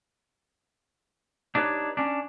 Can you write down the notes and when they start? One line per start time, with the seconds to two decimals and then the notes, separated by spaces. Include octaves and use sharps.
1.55 D4 D#4 G4 B4 C#5
1.97 C#4 D4